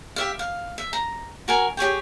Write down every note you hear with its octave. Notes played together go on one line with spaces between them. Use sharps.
G4 E5 F5
F5
E5
A#5
F#4 A#4 G#5
G4 G#4 C#5 G5